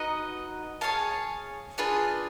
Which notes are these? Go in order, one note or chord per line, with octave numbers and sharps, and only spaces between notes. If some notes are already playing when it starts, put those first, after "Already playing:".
Already playing: D#4 F#4 B4 D#5
G#4 C#5 F5 A5
D4 F4 G#4 B4